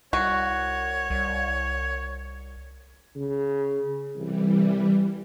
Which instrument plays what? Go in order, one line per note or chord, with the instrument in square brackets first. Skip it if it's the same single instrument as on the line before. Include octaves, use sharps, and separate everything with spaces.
[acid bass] C2 [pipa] F#4 [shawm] C#5
[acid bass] C2
[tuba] C#3
[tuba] C2 [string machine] E3 G3